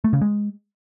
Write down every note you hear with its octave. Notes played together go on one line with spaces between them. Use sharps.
A3
C#3
G#3